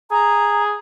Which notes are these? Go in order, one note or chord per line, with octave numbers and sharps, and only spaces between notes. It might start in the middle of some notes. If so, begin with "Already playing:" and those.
G#4 A#5